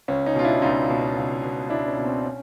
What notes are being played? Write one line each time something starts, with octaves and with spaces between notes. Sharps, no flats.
C#2 C#4
C#4 D#4
B2 F4
D4 E4
C#2 D#4 F4
B2
C#2
B2
C#2 D4 E4
C#4
B2
C4
C#4